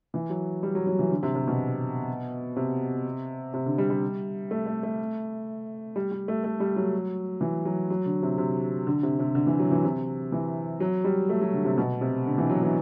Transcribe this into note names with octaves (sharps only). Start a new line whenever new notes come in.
E3
F#3
G3
F#3
F#3
E3
D3
C3
C3
B2
C3
C3
D3
G3
G3
A3
A3
A3
G3
G3
A3
A3
G3
F#3
E3
F#3
F#3
D3
C3
C3
D3
C3
C3
D3
E3
F#3
E3
C3
E3
F#3
G3
A3
F#3
D3
C3
B2
C3
D3
E3
F#3
E3